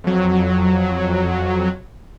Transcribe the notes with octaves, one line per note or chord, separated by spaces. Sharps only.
F2 F#3